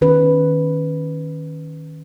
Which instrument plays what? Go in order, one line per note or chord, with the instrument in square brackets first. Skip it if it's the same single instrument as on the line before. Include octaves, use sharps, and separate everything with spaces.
[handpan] D#3 C#4 B4